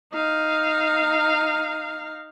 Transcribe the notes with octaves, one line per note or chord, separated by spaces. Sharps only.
D#4 F5